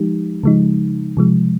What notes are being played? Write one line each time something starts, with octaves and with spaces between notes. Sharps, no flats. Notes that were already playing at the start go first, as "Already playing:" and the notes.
Already playing: F3 G#3 D#4 G4
C#3 F3 G#3 D#4
C3 F3 G#3